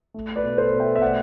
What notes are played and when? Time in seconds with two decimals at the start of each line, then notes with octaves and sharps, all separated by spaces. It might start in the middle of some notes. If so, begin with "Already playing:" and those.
0.14 A3
0.36 B4 D5
0.43 B2
0.58 A4 C5
0.73 B2
0.80 E5 G5
0.96 E5
1.01 A3 D5 F#5